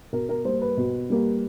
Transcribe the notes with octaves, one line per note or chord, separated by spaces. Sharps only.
B2 A#4
A#4
G3 A#3 C5
B4
B2
G3 A#3